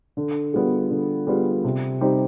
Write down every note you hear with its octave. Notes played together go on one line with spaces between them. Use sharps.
D3
G3 B3 F4 G#4
D3
G3 B3 F4 G#4
C3
G3 C4 D#4 G4